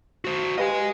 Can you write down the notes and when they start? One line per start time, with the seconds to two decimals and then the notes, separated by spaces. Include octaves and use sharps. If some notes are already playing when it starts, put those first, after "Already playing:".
0.25 F#4 C5
0.58 G4 B4 D#5 F5 G#5